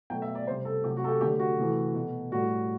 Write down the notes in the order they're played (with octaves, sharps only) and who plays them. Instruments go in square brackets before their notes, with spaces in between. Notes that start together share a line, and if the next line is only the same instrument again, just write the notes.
[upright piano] B2 F#3 A3 G5
E5
D5
G3 C5
C3
A4
C3 F#3 A3 G4
F#4
A4
G4
D3 F#3 A3 G4
F#4
C3 E3 A3
B2 A3
A2 G3 F#4